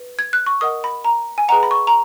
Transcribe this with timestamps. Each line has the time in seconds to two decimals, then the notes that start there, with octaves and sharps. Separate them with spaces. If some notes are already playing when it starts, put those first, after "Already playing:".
Already playing: B4
0.19 G#6
0.33 F#6
0.46 C#6
0.61 A#4 D#5 F#5 D#6
0.84 B5
1.05 A#5
1.38 G#5
1.48 G#4 B4 D#5 F#5 A#5
1.63 B5
1.71 C#6
1.87 A#5